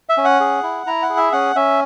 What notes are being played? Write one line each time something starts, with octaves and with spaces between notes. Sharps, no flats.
E5
C#4
F#5
G#4
E4
E4 A#5
F#5
G#4
E5
C#4 F#5
C#4 E5